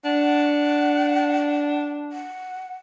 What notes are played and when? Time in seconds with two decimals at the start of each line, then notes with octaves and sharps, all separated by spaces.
0.05 D4 F#5
2.12 F#5